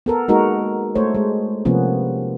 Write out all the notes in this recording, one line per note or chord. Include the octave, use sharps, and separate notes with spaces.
B3 A4 A#4
G#3 A#3 D#4 F#4 A#4
A3 C5 C#5
G#3
C3 F3 A#3 B3 C#4